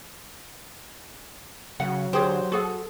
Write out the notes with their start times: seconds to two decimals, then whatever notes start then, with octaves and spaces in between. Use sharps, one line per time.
1.80 C#3 F#3 F#5
2.13 D3 G4 G#4 C5 C#5
2.52 F#4 G#4 A4 F#5